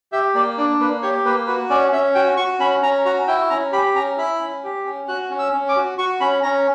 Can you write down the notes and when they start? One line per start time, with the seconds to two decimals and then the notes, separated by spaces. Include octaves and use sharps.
0.12 G4 E5
0.35 A#3 D5
0.57 D4 D5
0.79 A#3 B4
1.02 G4 C#5
1.25 A#3 B4
1.47 F#4 B4
1.70 C#4 D5
1.92 C#4 E5
2.14 F#4 G5
2.37 F#4 C#6
2.60 C#4 B5
2.82 C#4 A#5
3.05 F#4 A#5
3.28 E4 G5
3.50 C#4 A#5
3.72 G4 B5
3.95 C#4 A#5
4.17 E4 B5
4.40 C#4
4.64 G4
4.85 C#4
5.08 F#4 F#6
5.30 C#4
5.39 E6
5.53 C#4
5.69 D6
5.76 F#4
5.98 F#4 C#6
6.20 C#4 B5
6.43 C#4 A#5